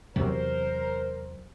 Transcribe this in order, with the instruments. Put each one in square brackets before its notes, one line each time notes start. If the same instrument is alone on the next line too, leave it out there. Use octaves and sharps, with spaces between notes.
[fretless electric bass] E2 C3 F#3 [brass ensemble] A#4 C5